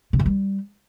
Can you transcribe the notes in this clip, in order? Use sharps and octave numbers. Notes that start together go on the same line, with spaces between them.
C#3
D#3
G3